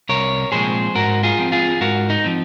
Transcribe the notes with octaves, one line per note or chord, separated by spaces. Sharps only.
C2 A#4 C#5
A#2 F3 G#3 C4 G#4 C5
G#2 F#4 A#4
F4 G#4
F3 C4
F4 G#4
G#2 F#4 A#4
D#4
F3 C4